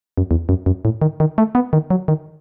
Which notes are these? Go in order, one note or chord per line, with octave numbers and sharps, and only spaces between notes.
F#2
E2
F#2
F#2
A2
D#3
D#3
A3
B3
D#3
F#3
D#3